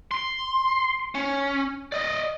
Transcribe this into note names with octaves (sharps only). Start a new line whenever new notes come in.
C6
C#4
D5 D#5